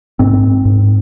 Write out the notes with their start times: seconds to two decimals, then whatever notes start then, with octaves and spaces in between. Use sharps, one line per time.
0.19 G#2 C4
0.65 G#2